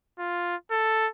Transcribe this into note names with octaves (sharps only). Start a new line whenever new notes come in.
F4
A4